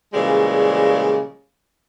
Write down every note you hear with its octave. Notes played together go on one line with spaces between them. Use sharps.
A#2 C#3 E3 F3 G3 G#3